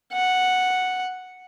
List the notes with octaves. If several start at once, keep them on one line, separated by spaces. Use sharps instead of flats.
F#5